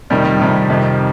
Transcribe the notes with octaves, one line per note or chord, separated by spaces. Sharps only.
F2 C3 D#3 G3
G3
F2 C3 D#3
F2 C3 D#3